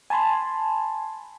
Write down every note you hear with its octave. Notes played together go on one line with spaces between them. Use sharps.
G#5 A5 B5 C6